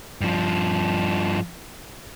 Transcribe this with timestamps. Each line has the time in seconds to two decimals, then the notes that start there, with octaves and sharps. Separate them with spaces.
0.21 G2 F3